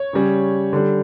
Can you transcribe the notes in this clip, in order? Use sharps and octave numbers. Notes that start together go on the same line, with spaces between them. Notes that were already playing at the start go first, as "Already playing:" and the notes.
Already playing: C#5
C#3 G3
D3 G3